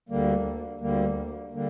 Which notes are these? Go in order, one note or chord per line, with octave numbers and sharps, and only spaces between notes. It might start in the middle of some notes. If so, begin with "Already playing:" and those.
D2 D3 G3 A#3
D2 D3 G3 A#3
D3 G3 A#3